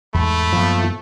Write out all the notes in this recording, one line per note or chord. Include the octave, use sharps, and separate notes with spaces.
E2 G#2 A3 B5
F#2 A#2 F3 B3